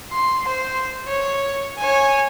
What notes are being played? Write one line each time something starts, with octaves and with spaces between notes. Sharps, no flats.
C6
C5
C#5
C#5 G#5